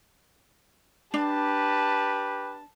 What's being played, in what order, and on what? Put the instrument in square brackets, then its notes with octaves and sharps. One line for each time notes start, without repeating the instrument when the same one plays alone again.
[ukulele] D4 [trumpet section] G4 B4 [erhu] A5